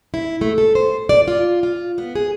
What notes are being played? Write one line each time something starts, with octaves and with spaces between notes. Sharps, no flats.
E4
A3
A4
C5
D5
F4
F4
B3
G#4